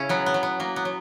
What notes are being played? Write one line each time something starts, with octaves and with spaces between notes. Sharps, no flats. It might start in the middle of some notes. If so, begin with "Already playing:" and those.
Already playing: C#3 C#4 E4
F#3 B3
B3
F#3
B3
F#3 A#3
B3
F#3